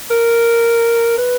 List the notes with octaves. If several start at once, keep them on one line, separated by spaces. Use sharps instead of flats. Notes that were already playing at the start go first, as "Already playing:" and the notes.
A#4
B4